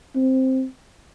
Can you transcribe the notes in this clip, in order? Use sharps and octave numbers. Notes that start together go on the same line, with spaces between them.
C4